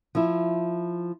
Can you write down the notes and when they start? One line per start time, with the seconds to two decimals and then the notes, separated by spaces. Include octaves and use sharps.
0.15 F3 E4